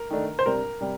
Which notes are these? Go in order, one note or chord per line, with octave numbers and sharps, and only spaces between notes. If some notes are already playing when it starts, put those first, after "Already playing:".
Already playing: A#4
D#3 A3 D4
C5
C3 G3 D4 A#4
C3 G3